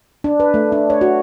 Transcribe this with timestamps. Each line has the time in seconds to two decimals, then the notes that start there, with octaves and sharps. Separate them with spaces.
0.24 D4
0.40 B4
0.54 A3
0.72 D4
0.90 C#5
1.01 F#4